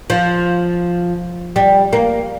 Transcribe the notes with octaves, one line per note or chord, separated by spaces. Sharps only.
F3
G3
A#3